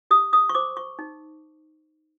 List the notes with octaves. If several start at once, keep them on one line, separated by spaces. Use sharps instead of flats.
G4 D#6
D#6
C#6
C5 D6
C#6
D#4